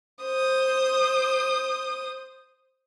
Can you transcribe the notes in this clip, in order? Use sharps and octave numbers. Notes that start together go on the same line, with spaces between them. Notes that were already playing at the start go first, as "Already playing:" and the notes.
C5 D#6